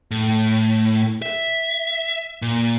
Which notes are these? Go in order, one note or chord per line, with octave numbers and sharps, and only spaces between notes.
A2
E5
A#2